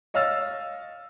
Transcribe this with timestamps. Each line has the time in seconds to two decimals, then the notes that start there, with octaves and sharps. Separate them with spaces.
0.14 C#5 D#5 F5 E6 F6 A6